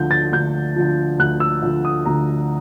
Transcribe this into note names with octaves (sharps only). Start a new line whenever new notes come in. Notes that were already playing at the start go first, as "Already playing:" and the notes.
Already playing: D2 D3 F3 G6
A6
D2 G6
D3 F3
D2 F#6
E6
D3 F3
D#6
D2 A#5